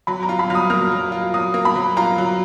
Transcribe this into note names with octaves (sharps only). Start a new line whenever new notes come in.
F#3 B5
A#5
F4
B5
F#3 F6
D#6
A#3 F6
F#3
F4
F#3 D#6
A#3
B5
F#3
F4 A#5
F#3